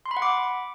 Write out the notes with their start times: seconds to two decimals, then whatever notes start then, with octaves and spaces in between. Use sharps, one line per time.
0.06 C6
0.11 B5
0.17 F#5
0.22 D6